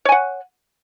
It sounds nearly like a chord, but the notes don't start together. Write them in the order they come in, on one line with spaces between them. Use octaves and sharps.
C#5 G#5 F#5